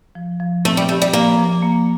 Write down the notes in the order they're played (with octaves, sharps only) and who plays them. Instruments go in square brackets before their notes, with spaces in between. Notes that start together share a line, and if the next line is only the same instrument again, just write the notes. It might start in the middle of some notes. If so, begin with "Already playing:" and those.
[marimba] F3
F3
[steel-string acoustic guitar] A3 [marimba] C4
[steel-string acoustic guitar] G3
[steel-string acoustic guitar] A3 [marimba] G4
[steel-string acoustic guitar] G3
[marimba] F3 [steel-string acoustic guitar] A#3
[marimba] F3
A#3